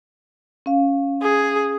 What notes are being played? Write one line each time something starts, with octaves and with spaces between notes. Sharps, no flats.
C#4 F5
G#4